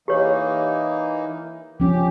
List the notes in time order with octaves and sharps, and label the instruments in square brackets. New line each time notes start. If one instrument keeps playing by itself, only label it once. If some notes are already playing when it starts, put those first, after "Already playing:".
[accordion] E3 A#3 D#4 [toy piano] G4 C#5
[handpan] F3 C#4 [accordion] G4